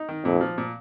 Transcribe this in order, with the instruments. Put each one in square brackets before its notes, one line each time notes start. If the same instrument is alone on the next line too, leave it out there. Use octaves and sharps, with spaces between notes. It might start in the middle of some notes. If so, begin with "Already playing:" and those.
Already playing: [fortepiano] D#4
D#3
[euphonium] F2 [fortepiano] A#2
[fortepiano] F3
A#2